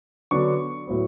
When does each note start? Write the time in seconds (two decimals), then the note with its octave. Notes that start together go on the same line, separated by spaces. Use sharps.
0.31 D3 F#3 B3 D4 C#6
0.87 A2 F#3 B3